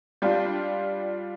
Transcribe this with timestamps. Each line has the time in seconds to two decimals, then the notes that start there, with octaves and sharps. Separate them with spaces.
0.22 G3 D4 F4